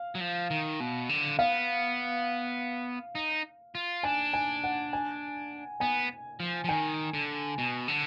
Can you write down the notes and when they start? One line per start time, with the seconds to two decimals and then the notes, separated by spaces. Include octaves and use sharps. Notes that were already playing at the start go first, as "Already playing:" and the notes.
Already playing: F5
0.15 F#3
0.21 F3
0.50 D#3
0.80 B2
1.09 D3
1.39 B3 F5
3.15 D#4
3.75 F4
4.03 D4 G#5
4.33 G#5
4.64 F#5
4.93 G#5
5.80 B3 G#5
6.40 F3
6.64 F3
6.69 D#3 G#5
7.14 D3
7.58 B2
7.88 D3